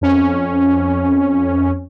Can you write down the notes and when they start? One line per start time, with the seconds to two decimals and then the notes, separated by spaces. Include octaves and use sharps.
0.01 F2 C#4